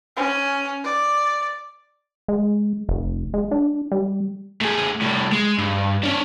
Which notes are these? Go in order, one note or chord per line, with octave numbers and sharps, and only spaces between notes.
C#4
D5
G#3
F1
G#3
D4
G3
A2 G#4
C2 A2
G#3
G2
C#4 D4